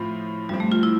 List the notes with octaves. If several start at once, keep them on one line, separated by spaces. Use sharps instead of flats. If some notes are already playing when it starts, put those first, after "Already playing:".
Already playing: A2 F3 C4 F4
G2 F3 G3 C4
A3
F4
E4